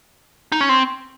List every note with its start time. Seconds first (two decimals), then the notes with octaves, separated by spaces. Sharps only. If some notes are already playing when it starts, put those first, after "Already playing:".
0.52 D#4
0.61 C#4
0.69 C4